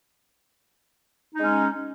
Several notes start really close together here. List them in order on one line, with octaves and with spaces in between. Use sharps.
D#4 G#3 C#4